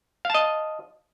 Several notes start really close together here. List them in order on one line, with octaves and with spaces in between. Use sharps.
F5 A5 D#5